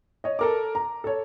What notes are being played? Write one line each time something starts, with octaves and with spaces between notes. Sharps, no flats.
C#5 D#5
A4 A#4 D6
A#5
A4 C#5